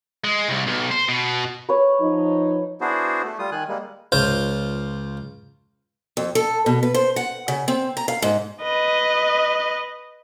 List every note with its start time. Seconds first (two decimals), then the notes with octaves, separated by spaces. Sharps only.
0.24 G#3
0.49 C2
0.68 B1
0.91 C5
1.09 B2
1.69 B4 C#5
2.00 F3 D#4
2.81 B3 D4 E4 F#4 G#4 C5
3.25 A3
3.39 G3 F4 D#6
3.52 D#3 G#5 F#6
3.69 G3 G#3 A#3
4.12 C#2 F4 C5
6.17 F2
6.35 A4
6.66 B2
6.83 B4
6.94 C5
7.16 F#5
7.48 C#3
7.68 C4
7.97 A#5
8.08 F5
8.22 G#2
8.62 B4 D#5